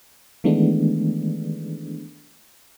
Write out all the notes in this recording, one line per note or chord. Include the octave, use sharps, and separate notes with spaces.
D#3 E3 G#3 A3 B3 D4